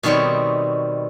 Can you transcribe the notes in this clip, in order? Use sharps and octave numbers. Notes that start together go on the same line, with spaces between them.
B2 D#3 G3 C4 C#5